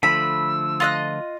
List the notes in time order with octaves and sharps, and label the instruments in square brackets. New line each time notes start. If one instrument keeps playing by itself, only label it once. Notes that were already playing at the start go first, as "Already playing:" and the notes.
[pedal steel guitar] D3 F3 A3 [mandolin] B5 [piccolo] E6
[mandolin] F4 D#5 F#6